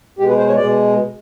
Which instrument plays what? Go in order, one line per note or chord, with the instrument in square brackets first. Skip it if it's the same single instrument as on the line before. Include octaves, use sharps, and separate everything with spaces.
[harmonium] B2 G#3 G4
B4
C5
C#5
B2 G#3 D5